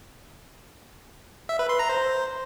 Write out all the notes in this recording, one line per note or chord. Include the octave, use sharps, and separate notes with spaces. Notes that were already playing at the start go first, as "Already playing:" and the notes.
E5
B4
C6
A#5
C5